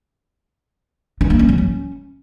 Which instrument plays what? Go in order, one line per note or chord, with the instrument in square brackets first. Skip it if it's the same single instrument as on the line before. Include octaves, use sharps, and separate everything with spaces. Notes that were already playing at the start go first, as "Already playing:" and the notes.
[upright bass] D4
A#3
C#4
F#3
C#4